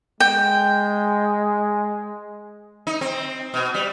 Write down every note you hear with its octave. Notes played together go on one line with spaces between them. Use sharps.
G#3 G5
D#4
C4
B2
G3